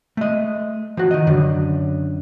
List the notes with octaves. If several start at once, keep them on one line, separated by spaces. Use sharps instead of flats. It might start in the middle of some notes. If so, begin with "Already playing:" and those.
A3 D#5
F3 F#4
D#3 D#5
F#2 D3